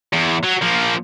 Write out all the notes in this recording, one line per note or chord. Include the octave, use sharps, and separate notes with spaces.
E2
F#3
F3 A#3